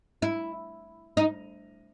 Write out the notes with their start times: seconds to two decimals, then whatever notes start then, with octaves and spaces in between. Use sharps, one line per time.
0.22 E4
1.17 D#4